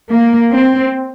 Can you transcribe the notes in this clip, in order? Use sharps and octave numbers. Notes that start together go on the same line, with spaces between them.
A#3
C4